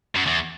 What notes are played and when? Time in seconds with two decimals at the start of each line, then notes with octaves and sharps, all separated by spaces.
0.15 F#2
0.26 E2